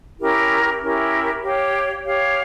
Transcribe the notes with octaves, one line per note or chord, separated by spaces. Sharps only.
C#4 E4 G4 A#4
C#4 E4 G4 A#4
G4 C#5 F5
G4 C#5 F5